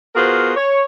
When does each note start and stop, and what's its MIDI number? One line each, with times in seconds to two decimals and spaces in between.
0.15 0.55 59
0.15 0.55 65
0.15 0.55 66
0.15 0.55 68
0.15 0.55 70
0.15 0.55 72
0.56 0.83 73